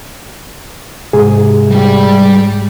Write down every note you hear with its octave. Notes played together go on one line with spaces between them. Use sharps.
G#2 C3 G#4
G3 G4